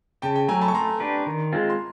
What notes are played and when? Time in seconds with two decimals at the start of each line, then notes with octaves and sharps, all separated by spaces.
0.22 C#3 G5 A5
0.36 G5 A5
0.48 F#3 A3 G#5 A#5
0.61 A5 B5
0.68 C#6
0.74 A3 A#5 C6
1.00 D4 G4 B4
1.26 D#3
1.52 G#3 C4 F4
1.70 C6